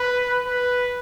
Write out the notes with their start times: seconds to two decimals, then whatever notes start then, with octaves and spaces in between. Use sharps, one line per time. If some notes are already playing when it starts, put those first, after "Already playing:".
Already playing: B4
0.47 B4